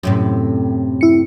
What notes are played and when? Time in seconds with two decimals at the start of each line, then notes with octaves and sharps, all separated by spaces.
0.03 F#2 A2 C3
1.01 E4 C#7